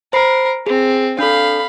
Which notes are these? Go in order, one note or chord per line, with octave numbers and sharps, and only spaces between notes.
A#4 C5 B5 C7
C4 G#4
D4 A4 F5 B5